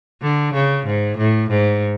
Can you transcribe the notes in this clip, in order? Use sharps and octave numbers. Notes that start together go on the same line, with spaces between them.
D3
C#3
G#2
A2
G#2